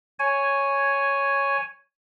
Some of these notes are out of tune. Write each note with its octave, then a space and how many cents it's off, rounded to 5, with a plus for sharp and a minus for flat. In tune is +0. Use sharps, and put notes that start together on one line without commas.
C#5 +0 G#5 +0